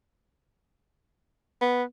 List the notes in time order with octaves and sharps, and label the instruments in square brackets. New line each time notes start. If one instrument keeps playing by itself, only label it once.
[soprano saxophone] B3